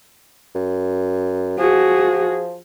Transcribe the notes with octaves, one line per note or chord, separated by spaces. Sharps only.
F#2
F3 F#4 G#4